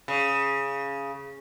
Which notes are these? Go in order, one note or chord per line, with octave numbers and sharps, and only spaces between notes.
C#3